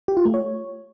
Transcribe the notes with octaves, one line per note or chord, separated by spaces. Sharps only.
G4
F4
A3
C#5